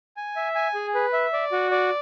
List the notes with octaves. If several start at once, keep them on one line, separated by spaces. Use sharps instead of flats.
G#5
E5
G#5
G#4
B4
E5
D5
F#4
D5